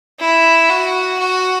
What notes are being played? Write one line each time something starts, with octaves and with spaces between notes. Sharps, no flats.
E4
F#4
F#4